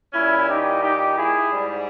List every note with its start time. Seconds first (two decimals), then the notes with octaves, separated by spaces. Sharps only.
0.14 A#2 G3 C#4 E4
0.48 D#4 G4
0.82 D#4 G4
1.17 E4 G#4
1.51 G#2 G3